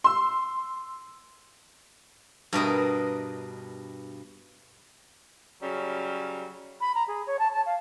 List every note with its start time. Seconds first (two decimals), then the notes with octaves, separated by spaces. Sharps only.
0.04 C6 E6
2.53 G2 B2 A#4 D#5
5.63 C#3 F#3 G3
6.81 B5
6.95 A#5
7.08 G#4
7.27 C#5
7.39 A5
7.53 A5
7.66 F5